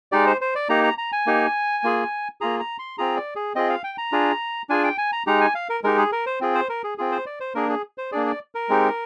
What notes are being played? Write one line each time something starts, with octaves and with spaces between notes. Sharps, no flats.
G#3 D#4 G4 D5
C5
C5
D5
A#3 D#4 G4 A#5
A#5
A#5
G#5
A#3 D#4 G4
A#3 F4 G#4
A#3 F4 G#4 A#5
A#5
C6
C4 F4 G#4 A#5
D5
G#4
C4 F4 G#4 D#5
F5
G5
A#5
D4 F4 G#4
D4 F4 G#4 G#5
G5
G#5
A#5
G#3 D#4 G4 A#5
G#5
F5
A#4
G#3 D#4 G4 A#4
G#4
A#4
C5
C4 F4 G#4
C5
A#4
G#4
C4 F4 G#4
C5
D5
C5
A#3 D4 G#4 A#4
G#4
C5
A#3 D4 G#4 D5
D5
A#4
G#3 C4 D#4 G4